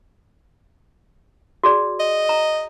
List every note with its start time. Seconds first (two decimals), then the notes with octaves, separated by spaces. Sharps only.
1.64 F#4 G#4 D5
2.00 D#5
2.29 A#5